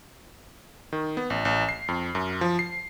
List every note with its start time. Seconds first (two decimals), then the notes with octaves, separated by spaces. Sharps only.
0.93 D#3
1.17 B3
1.30 A1
1.45 A1
1.69 C7
1.88 F2
2.15 F#2
2.41 F3
2.59 C7